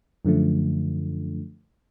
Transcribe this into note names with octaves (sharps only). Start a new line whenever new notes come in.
F#2 D3 F3 A3